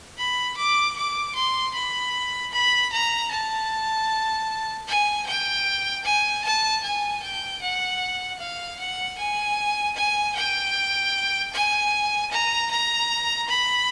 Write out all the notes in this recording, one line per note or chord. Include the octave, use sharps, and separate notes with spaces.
B5
D6
D6
C6
B5
B5
A#5
A5
G#5
G5
G#5
A5
G#5
G5
F#5
F5
F#5
G#5
G#5
G5
G#5
A#5
A#5
B5